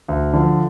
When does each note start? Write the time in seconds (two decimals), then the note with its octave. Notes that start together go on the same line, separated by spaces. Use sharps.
0.08 D2
0.33 D3 F3